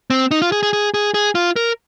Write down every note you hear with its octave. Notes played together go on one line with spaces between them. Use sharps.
C4
D#4
F4
G#4
G#4
G#4
G#4
G#4
F4
A#4